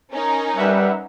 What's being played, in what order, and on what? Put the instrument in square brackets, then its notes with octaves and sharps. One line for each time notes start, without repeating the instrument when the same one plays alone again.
[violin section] C#4 D#4 A#4
[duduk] G3 [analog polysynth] B4 E5 F#5